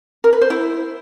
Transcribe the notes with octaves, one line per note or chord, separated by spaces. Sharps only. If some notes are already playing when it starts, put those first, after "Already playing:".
A#4
B4
C5
E4